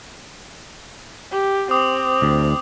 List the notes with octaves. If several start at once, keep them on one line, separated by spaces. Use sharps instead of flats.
G4
C4 D6 D#6
D2